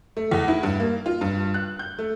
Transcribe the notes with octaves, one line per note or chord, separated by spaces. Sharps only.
A3
E2
E4
G2
A#3
F4
G2
F#6
G6
A3